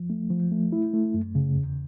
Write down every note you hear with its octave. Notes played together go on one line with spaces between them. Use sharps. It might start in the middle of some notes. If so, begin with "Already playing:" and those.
Already playing: F3
A3
F3
A3
E4
A3
F#2
C#3
E2